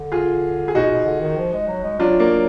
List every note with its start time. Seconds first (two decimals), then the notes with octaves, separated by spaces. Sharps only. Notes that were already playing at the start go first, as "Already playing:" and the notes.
Already playing: D3
0.12 F4 G#4
0.68 G#4
0.74 B2 D#4 F#4
0.90 B2
1.06 D3
1.21 D#3
1.37 F3
1.53 G#3
1.68 F#3
1.83 G#3
1.99 F#3 D4 F4
2.20 A#3 D4
2.30 F#3